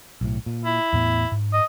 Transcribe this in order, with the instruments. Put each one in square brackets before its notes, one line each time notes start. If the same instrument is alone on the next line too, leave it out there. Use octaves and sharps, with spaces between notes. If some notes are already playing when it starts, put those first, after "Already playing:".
[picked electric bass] B1 A2
A#2
[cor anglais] E4
[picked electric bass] E2 A2 B3
G#2
[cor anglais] D#5